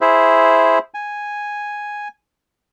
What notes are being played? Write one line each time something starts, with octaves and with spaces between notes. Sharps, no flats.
E4 G#4 C5 E5
G#5